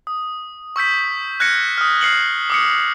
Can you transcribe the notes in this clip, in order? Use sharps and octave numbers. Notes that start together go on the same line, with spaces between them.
D#6
C#6 E6 G6 B6
F6 F#6 G#6 A#6 C#7
D#6 F6
F6 C7 C#7 F#7
D6 D#6 C#7